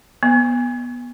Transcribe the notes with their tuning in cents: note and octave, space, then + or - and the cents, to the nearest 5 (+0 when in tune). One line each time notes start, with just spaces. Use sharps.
B3 -20